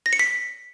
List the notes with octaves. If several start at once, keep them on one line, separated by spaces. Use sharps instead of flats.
A#6
C#7
B6